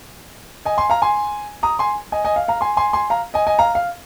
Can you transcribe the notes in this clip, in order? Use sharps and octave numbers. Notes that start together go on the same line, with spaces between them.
D#5 G#5
G#5 C6
F5 A#5
G#5 C6
A#5 D#6
G#5 C6
D#5 G#5
D#5 G#5
F5
F5 A#5
G#5 C6
G#5 C6
G#5 C6
F5 A#5
D#5 G#5
D#5 G#5
F5 A#5
F5